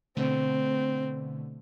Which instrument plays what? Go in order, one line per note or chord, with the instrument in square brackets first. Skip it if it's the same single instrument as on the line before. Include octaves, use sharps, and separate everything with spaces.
[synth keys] B2 D3 A3 [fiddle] C4